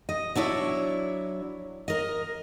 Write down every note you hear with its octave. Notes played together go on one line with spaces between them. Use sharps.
D#5
F#3 D4 E4 C#5
A#4 D#5